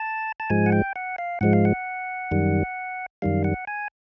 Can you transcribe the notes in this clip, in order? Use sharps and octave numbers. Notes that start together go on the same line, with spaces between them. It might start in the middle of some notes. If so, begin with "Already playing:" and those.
Already playing: A5
A5
G#2 F3 G#3 G#5
F#5
G5
F#5
F5
G#2 F3 G#3 F#5
F5
F#5
F#2 D#3 G3
F#2 D#3 G3 F5
F#5
G#5